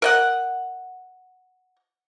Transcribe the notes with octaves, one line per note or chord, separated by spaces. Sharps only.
A#4 D#5 F#5